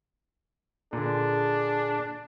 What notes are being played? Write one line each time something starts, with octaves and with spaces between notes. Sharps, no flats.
A#2 D3 D4 G#4